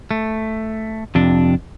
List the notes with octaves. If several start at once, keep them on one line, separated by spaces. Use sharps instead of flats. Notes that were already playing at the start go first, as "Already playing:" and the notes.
A3
F2 C3 D4